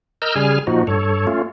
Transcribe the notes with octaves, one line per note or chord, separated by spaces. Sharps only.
A#4 D#5 E6 F6 G6
C#3 G3 G#4 G#5 F6
A#2 F3 D#4 F#4
G2 A4 C#5
A3 C#4 F4